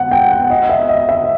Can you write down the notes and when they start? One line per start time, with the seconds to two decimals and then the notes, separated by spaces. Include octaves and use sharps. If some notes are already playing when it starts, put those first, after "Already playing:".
Already playing: F#5
0.11 G5
0.31 F#5
0.50 D#5
0.69 E5
0.89 D#5
1.09 E5